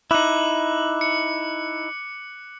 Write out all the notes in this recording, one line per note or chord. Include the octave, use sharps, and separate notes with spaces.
D#4 E4 D6 F#6 F#7
C#7